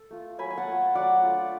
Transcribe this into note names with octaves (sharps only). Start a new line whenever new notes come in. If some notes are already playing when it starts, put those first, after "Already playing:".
Already playing: A4
A3 F4
F#3 G#5 B5
G#5
F#5 A5
A3 F4
F#3 D5 F#5
A3 D4 F4